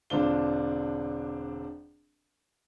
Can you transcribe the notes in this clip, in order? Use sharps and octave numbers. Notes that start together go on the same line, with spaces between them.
E1 D3 C4 D4 F4 G7